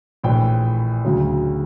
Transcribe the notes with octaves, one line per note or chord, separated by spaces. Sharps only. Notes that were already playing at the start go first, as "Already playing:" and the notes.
A#1 A2 E3 G5
D2 C#3 F#3